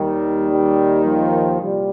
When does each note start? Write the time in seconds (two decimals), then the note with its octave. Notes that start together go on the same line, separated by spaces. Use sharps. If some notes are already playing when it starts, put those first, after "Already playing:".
Already playing: D#2 D#3 G3
0.49 G3
1.05 F3
1.60 C2 A#2 G3